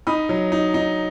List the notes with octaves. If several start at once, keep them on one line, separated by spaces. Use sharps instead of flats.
D#4 B5 D#6
F#3
D#4
D#4